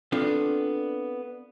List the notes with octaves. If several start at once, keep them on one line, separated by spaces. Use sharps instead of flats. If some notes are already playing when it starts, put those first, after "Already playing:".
B3 C4 D4 F4 A4